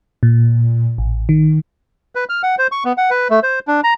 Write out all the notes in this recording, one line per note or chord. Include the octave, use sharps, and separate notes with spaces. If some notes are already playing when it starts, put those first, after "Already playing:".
A#2
A1
D#3
B4
F6
F#5
C5
C#6
B3
F#5
B4
A3
C5
D4
A#5